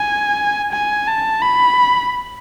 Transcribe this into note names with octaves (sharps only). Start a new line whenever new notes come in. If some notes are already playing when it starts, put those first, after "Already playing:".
Already playing: G#5
G#5
A5
B5